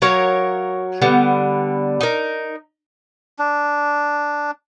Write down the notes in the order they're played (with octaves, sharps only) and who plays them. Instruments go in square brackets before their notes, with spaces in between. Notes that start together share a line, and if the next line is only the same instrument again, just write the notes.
[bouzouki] F#3 A#4 C#5 F5
D3 G3 B3
D#4 A#4
[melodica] D4